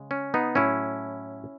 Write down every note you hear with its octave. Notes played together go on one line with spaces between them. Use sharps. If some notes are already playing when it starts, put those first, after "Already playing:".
Already playing: C#3 G#3
C#4
B3 D#4
A2 F#3 A3 C#4 E4